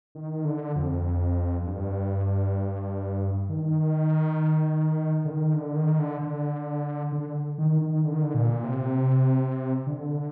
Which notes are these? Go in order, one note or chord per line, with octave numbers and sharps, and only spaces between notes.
D#3
D3
F2
F2
G2
D#3
D3
D#3
D3
D#3
D3
D3
D3
D#3
D#3
D3
D#3
D3
A#2
C3
D3